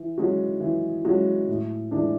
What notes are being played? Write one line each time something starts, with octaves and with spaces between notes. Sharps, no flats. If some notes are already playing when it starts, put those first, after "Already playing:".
Already playing: E3
G#3 C#4 F#4
E3
G#3 C#4 F#4
A2
E3 G#3 D4